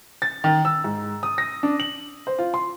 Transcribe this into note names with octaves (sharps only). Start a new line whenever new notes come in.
A6
D#3
E6
G#2
D#6
A#6
D4
F#7
C5
F4
C6